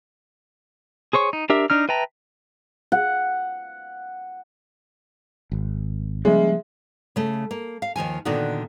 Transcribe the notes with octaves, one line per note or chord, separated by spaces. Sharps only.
G#4 C5 C#5 C#6
D#4
D4 G4 A#4 E5
D4 D#4 F6
B4 E5 G5 A5 A#5
F#5
G#1
C#3 F3 G3 G#3 A#3 G#4 E5
C#3 A3
A#3
F5
D#2 D#3 F3 G#5
A#2 D3 D#3 B3 D#4 F#4